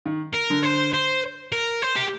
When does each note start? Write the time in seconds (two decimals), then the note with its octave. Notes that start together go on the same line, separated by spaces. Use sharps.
0.06 D#3
0.34 A#4
0.50 D3
0.64 C5
0.94 C5
1.53 A#4
1.82 C5
1.96 G4